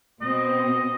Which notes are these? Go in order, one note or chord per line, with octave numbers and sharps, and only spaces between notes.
B2 C4 D#5